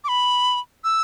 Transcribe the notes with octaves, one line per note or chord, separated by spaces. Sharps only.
D6
B5
E6